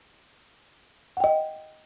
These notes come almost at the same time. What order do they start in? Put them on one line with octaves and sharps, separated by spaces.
F#5 G5 D#5